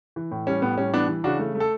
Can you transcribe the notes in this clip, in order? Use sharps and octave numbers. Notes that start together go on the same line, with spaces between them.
E3
A2
G3 C#4
A2 B3
G3 C#4
E3 B3 D4
E3
C#3 D4 F#4
A3
A3
A4